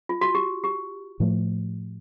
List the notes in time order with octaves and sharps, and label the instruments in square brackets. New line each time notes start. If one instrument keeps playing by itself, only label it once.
[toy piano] F4
F#4
G4
G4
[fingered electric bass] A2 F3 A3